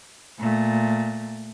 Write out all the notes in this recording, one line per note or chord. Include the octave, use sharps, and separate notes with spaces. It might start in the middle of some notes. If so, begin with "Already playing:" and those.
A#2 A3